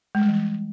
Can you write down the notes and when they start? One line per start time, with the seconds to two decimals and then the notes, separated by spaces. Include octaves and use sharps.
0.15 G#3
0.22 G3
0.28 E3